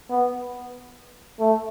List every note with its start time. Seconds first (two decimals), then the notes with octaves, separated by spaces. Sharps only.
0.10 B3
1.40 A3